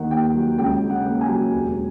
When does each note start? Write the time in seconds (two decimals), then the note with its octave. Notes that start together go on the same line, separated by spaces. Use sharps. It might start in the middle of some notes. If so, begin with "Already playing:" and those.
Already playing: D#2 D#3 F#5
0.11 D#2 G5
0.34 F#3
0.58 C#2 G5
0.82 C#3
0.90 F#5
1.06 A#3
1.21 G#5
1.29 F#3
1.53 E1